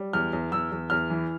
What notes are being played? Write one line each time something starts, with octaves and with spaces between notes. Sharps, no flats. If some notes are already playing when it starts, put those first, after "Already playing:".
Already playing: G3
E2 F6
E2
E2 E6
E2
E2 F6
E3